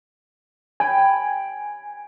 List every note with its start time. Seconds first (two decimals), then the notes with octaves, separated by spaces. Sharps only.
0.80 G5 G#5 B5